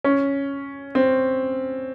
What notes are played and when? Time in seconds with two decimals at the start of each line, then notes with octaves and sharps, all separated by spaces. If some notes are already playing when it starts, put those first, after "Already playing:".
0.04 C#4
0.95 C4